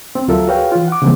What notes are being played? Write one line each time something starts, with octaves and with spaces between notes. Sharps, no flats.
C4
D2 F#3 F4 A4 A#4 E5
F#4 G#4 B4 C#5 F5 G5
E3 F4
F#5 D6
C#3 E3 F3 G#3 A#3 C4